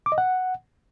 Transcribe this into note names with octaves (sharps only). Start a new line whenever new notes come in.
D6
D#5
F#5